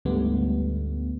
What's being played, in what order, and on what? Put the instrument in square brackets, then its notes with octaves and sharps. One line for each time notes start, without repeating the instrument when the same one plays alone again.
[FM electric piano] D2 G#2 D3 G3 A3 B3